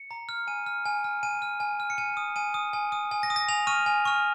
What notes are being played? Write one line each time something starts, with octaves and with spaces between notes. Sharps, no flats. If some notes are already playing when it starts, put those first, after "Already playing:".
Already playing: C#7
A#5
F6
G#5 D#7
F6
G#5
F6
G#5 D#7
F6
G#5
F6
C#7
G#5 D#7
D#6
G#5 D#7
D#6
G#5
D#6
G#5
A#6
D#6
A#6
G#5 F7
C#6 F6 D#7
G#5
C#6 F6